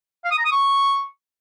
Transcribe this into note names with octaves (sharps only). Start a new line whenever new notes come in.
F5
D#6
A#5
D#6
C#6